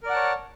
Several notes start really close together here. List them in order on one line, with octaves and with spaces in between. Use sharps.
A#4 D5 F#5 A5 C#5